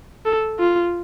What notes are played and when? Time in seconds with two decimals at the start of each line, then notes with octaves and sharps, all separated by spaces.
0.26 A4
0.59 F4